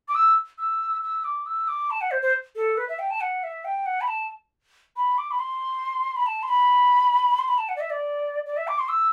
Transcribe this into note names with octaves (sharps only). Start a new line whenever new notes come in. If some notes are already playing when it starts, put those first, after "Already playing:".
D6
E6
E6
E6
D6
E6
D6
A5
F#5
C5
C5
A4
B4
E5
G5
A5
F#5
E5
G5
F#5
B5
A5
B5
D6
B5
C6
B5
A5
C6
B5
C6
B5
A5
F#5
D5
E5
D5
D5
E5
D6
C6
E6